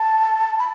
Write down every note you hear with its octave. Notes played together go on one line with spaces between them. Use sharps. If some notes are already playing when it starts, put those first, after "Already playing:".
Already playing: A5
B5